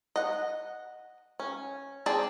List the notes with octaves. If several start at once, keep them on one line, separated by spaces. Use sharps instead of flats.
D#5 F#5
C#4
C4 G#4 D5 A5